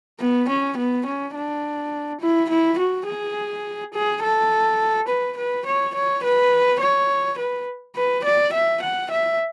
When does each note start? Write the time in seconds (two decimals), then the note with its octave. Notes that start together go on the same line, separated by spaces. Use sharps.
0.20 B3
0.49 C#4
0.77 B3
1.06 C#4
1.35 D4
2.21 E4
2.49 E4
2.79 F#4
3.07 G#4
3.94 G#4
4.23 A4
5.08 B4
5.37 B4
5.66 C#5
5.95 C#5
6.23 B4
6.81 C#5
7.38 B4
7.96 B4
8.24 D5
8.53 E5
8.82 F#5
9.11 E5